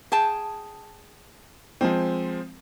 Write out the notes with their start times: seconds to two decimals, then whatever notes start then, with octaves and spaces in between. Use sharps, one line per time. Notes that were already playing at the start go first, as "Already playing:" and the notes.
0.12 G#4 G5 A5
1.81 F3 G#3 C4